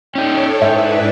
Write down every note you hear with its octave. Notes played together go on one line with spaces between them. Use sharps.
C#4 D#4 A4 C#5 G5
G#2 D4 E4 B4 E5